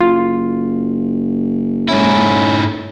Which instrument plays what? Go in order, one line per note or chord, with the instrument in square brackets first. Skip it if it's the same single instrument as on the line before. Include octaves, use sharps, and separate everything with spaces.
[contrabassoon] F#1 [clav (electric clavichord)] F4
[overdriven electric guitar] G#2 E4 [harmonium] C#4